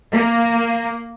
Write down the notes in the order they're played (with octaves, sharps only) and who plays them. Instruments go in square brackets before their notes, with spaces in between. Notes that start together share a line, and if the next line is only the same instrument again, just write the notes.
[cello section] A#3